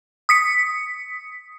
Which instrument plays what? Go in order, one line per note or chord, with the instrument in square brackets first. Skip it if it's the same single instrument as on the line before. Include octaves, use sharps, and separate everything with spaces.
[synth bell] D#6 B6 C#7